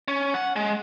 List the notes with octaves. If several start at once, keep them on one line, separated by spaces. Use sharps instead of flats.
C#4
F#5
G#3